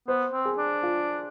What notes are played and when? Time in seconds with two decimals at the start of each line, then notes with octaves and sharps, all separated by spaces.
0.08 B3 C5
0.33 C4
0.45 G#4
0.58 D4
0.83 F4